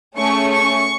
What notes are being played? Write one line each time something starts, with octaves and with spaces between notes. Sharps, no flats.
A3 C#4 G#4 C#6
C#6